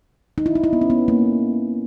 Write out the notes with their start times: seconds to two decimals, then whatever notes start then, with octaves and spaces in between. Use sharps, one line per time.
0.38 D#4
0.46 E4
0.55 D#4
0.64 E4
0.73 B3
0.81 C#4
0.90 B3
1.08 A#3